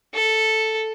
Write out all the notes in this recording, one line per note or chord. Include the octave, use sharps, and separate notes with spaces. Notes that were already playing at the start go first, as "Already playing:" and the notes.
A4